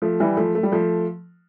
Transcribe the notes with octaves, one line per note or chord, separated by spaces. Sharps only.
F3 A3
E3 G3
F3 A3
A3
G3
F3 A3